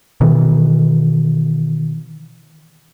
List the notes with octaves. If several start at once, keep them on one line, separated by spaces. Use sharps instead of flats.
B2 D#3 E3